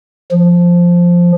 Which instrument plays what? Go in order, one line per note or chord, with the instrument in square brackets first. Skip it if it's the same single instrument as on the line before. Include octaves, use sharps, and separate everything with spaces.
[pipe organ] F3